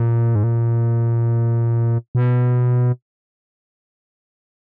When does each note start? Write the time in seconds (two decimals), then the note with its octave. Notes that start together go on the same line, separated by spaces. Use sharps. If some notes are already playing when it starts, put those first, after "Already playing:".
Already playing: A#2
0.35 G#2
0.44 A#2
2.15 B2